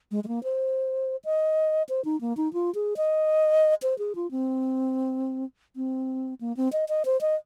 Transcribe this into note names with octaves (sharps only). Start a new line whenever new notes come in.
G#3
G#3
A#3
C5
D#5
C5
D#4
A#3
D#4
F4
G#4
D#5
C5
G#4
F4
C4
C4
A#3
C4
D#5
D#5
C5
D#5